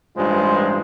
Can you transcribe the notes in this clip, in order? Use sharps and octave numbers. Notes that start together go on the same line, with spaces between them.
A1 G2 G#3 F4 C5